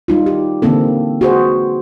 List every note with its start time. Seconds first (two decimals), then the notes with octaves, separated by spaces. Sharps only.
0.08 G3 D#4 F4
0.26 G4
0.62 D3 E3 A#3 C4 A4
1.21 F#4 G#4 C5